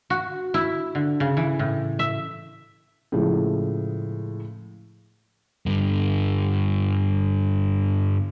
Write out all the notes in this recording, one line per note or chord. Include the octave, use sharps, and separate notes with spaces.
F#4
E4
D3
C#3
E3
A2
E5
A2 C#3 F3 G#3
G2 D3